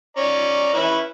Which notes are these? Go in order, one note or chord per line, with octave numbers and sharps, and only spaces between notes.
C#4 D5 A#5
C#4 E4 B4